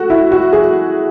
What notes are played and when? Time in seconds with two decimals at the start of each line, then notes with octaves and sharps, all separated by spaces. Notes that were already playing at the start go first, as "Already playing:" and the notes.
Already playing: F#4 A4
0.10 E4
0.32 F#4
0.52 G#4